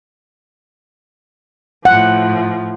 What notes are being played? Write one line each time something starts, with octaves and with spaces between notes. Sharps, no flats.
A2 F3 F#5